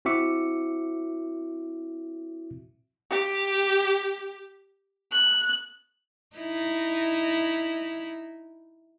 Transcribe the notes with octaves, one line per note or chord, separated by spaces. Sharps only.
C4 E4 F#4 E5 D6 C#7
G4
F#6
D#4 E4